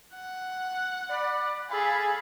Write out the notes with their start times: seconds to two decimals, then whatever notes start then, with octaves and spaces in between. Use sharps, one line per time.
0.15 F#5
1.10 D5 B5
1.71 G#4 A4 F5 B5